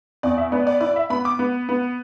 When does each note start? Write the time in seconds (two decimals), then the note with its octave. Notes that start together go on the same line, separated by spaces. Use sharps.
0.23 E2 D5
0.38 E5
0.52 B3 D5
0.67 D5
0.81 E4 D5
0.96 E5
1.10 B3 B5
1.25 D6
1.39 B3
1.69 B3